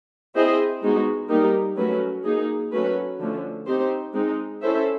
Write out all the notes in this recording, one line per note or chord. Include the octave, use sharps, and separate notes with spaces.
C4 E4 G#4 C5 D#5
G#3 B3 D#4 F#4
G3 A#3 D#4 G4 A#4
F#3 A3 C#4 F#4 B4
A#3 D#4 G#4
F#3 A3 C#4 F#4 B4
D3 F3 A3 C#4
C4 D#4 G4 C5
G#3 C4 D#4
C#4 E4 A4 C5 E5